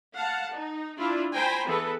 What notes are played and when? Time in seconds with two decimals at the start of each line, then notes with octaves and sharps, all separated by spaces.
0.14 F5 F#5 A5
0.52 D#4
0.98 D4 E4 F4
1.34 C5 G5 G#5 A#5 B5
1.67 E3 B3 G#4 A4 B4